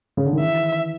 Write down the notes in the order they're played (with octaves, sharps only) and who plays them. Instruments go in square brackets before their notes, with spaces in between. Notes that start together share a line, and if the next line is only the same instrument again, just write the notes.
[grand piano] C#3
D3
D#3
[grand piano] E3 [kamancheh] E5